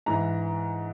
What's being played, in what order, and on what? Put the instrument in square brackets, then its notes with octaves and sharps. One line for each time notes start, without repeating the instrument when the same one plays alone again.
[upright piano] G#2 E3 A#5